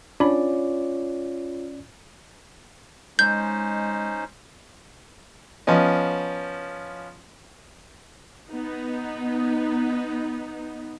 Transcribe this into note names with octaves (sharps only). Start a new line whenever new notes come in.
C#4 D4 F4 C#5 D5 B5
G#3 C#4 D#4 C5 G6
F3 B3 C#4 D#5
B3 D#4